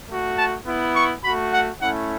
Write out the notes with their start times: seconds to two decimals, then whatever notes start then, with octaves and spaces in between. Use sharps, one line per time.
0.09 A3 F#4
0.38 A5
0.66 B3 E4
0.96 C#6
1.24 A3 F#4 B5
1.53 F#5
1.82 A3 C#4 E4 F#5